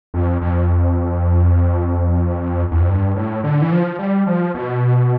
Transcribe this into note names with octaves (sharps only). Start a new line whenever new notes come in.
F2
F2
E2
F2
G2
A2
D3
E3
F3
G3
F3
B2